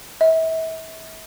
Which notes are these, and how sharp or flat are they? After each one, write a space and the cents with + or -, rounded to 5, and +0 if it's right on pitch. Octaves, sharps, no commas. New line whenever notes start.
E5 -35